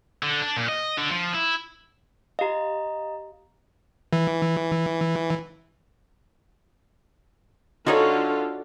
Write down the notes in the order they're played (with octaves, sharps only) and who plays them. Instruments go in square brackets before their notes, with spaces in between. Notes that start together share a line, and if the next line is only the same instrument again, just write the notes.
[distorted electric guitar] D3
D4
A#2
D#5
D3
F3
E4
[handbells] G4 F5 [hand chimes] D#5 A#5
[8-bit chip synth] E3
[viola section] D3 F4 A4 [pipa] G#3 D#4 C#5 [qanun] F#4 D5